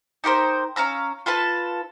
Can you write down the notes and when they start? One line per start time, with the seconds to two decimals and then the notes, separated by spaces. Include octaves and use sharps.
0.24 D#4 G4 A#4 C5
0.76 C#4 F5 A#5 E6
1.26 F4 A4 B4 A5